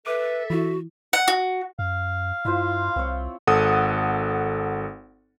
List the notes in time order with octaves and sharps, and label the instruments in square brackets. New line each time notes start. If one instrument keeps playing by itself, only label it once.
[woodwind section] A4 E5 [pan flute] B4 [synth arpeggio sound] D6
[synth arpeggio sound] E3 E4 [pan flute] F#4
[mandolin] F#5
F#4
[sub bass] F#2 [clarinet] F5
[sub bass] G2 [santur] E4 F4 C5
[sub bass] C2 [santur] C4 C#5
[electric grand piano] G#1 A4 F#5 D#6